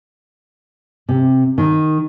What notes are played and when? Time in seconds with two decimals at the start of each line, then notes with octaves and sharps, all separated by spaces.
1.09 C3
1.58 D#3